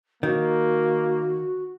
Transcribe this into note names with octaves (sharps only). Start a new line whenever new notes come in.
D#3 A#3 F#4